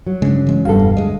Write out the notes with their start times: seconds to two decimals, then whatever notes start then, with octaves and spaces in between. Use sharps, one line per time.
0.07 F#3
0.22 G2 C#3 G#3 B3 D4
0.47 E3 G#3 C#4
0.65 E1 G2 B3 A4 F5
0.79 E1
0.97 D1 G#3 D#5